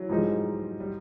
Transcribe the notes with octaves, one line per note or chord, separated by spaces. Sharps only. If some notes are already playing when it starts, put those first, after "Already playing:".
Already playing: E3 F#3
G#2 F3 G3 G#3 B3 D#4
G3